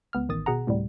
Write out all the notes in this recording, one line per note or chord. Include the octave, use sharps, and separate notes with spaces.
C#2 B3 F6
A1 D#3 D#6 A6
B2 G#4 F#5 A#5
D2 A2 C3 G3